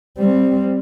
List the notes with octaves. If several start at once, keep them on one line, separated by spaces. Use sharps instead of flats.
G3 C4